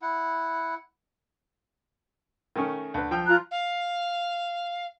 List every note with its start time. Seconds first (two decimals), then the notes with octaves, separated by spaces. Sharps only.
0.02 E4 F#5
2.56 D#3 A3 C#4
2.94 D2 B4
3.11 F3 G5 E6
3.27 F4 A#5 F#6
3.51 F5